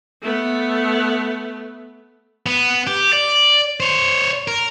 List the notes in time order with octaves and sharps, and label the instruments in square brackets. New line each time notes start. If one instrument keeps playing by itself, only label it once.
[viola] A3 B3
[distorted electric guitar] B3
G4
D5
C5 C#5
A#4